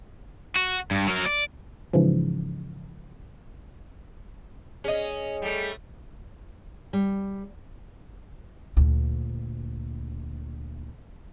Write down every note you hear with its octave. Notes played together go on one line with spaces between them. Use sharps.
F#4
G2
F#3 A#4
D5
G#2 C#3 E3 F3
C#4 G#4 D#5
G3 A3
G3
D2 A#2